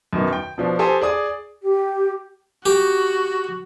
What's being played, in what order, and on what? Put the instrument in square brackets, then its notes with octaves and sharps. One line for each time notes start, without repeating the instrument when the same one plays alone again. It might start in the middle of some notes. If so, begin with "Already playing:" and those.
[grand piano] F#2 B2 D#3
G5
B2 F3 D4
G4 A4 C5 G#5 D#6
G#4 D5 D#6
[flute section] G4
[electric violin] F#4 [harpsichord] G4